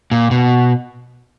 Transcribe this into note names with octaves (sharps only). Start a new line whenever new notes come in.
A#2
B2